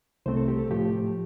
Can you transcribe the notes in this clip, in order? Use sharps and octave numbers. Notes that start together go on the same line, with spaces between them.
C2 C3 A3 C4 C5
A4
G4
A4
A2 F3 A3 G4